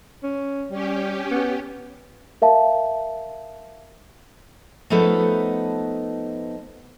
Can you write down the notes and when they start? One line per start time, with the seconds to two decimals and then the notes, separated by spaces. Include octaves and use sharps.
0.23 C#4
0.71 G3 C#4 G4
1.31 B3
2.42 A#4 E5 F5 A5
4.90 F3 A3 B3 D#4 A4 B4